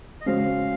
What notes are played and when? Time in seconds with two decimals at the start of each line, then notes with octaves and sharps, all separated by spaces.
0.21 D#5
0.26 C#3 G#3 C#4 F#4 C5 F5